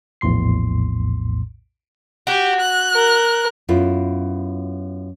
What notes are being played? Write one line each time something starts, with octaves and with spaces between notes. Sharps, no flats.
A#1 E2 A2 C6 C7
F#4 G4
F#6
A#4
F#2 B3 E4 F4